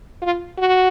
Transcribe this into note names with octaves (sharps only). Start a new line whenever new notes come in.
F4
F#4